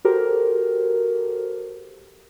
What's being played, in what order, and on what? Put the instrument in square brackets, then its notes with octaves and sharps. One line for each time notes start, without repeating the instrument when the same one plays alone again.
[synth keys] F#4 G4 A4 A#4 C5